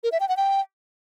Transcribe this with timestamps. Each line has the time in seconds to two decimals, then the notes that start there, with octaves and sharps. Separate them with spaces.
0.04 A#4
0.12 E5
0.20 G5
0.29 F#5
0.37 G5